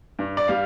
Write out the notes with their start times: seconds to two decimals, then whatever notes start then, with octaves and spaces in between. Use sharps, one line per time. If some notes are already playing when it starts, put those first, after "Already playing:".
0.19 G2
0.37 D5
0.48 G3 F5